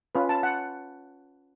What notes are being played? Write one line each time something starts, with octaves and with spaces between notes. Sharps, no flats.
C#4 F4 B4
A5
F#5